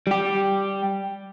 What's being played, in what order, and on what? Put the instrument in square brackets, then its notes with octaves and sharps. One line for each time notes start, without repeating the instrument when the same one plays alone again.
[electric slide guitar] G3 G4